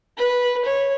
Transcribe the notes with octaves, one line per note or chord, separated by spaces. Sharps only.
B4
C#5